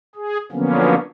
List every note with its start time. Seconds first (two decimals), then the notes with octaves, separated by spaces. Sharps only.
0.16 G#4
0.52 D3 F3 F#3 A#3 B3 C#4